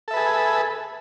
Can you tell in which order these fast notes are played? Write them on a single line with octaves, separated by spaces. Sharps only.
A4 E5 B4 G#4